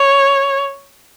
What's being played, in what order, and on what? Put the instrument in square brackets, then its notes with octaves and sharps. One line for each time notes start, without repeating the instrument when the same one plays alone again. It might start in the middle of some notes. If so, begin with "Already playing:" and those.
Already playing: [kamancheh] C#5